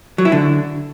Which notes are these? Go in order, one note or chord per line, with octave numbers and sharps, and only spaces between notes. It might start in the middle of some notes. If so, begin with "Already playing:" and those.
F#3
E4
D3